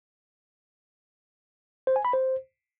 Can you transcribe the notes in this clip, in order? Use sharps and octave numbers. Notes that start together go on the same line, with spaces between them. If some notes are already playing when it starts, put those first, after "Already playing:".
C5
G#5
B5
C5